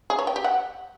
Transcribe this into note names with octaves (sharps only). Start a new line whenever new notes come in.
G#4
C#5
G5
G4
F#5